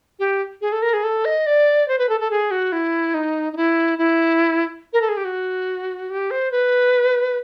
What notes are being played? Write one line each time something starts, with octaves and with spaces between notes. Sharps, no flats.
G4
G#4
A4
A#4
G#4
A4
D#5
D5
C5
B4
A4
A4
G#4
F#4
E4
D#4
D#4
E4
E4
A#4
A4
G#4
G4
F#4
G4
C5
B4